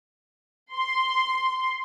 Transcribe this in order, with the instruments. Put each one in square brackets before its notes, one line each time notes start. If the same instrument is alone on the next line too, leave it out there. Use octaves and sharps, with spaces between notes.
[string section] C6